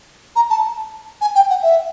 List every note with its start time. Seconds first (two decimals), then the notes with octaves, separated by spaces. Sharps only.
0.36 A#5
0.50 A5
1.21 G#5
1.35 G5
1.50 F#5
1.63 E5